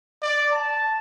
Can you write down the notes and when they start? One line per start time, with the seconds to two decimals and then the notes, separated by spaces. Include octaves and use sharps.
0.22 D5
0.52 A5